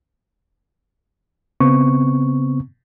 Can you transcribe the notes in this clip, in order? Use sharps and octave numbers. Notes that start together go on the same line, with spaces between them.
C#3 B3 C4 C#6